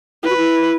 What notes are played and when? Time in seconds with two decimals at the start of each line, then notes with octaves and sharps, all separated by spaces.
0.23 E4 B4
0.30 F#4
0.37 E4